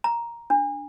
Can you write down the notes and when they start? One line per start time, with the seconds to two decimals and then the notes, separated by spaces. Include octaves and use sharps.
0.04 A#5
0.50 D4